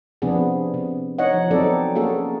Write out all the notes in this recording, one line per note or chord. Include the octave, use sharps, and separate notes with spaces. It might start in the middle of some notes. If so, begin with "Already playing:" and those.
C3 F3 B3 D4 G#4
C3
D#4 C#5 D#5 F#5
F3
F#3 B3 C4 D#4 A4 D5
A#3 C#4 F#4 G#4 A4